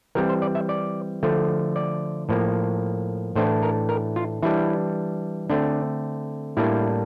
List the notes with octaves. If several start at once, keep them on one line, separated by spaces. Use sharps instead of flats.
E3 G3 C4 A#4
C5
D5
E5
D5
D3 F3 A3
D5
A2 F3 A#3
A2 E3 A3 D4 C5
A#4
A#4
F4
E3 G3 D4 E4
D3 A3 C4 D4
A2 G3 A#3 D4 E4